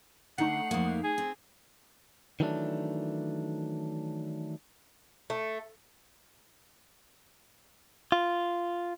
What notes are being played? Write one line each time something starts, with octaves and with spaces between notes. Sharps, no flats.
D3 A3 D#4 F#5 C7
F2 A#3
G#4
C4
D#3 E3 F#3 A3 C#4 D4
A3
F4